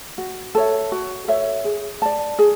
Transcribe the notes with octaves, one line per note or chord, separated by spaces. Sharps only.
F#4
A4 C#5 E5
F#4
A4 C#5 E5
G#4
D5 A5
G#4